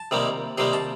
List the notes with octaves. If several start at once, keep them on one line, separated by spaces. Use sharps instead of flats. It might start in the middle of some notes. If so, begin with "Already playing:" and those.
Already playing: A5
C3 D#3 G3 A#3
C3 D#3 G3 A#3 C6
A5